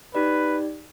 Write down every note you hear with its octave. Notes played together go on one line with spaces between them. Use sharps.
D#4 G4 B4 D5